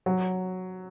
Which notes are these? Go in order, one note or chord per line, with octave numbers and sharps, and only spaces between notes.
F#3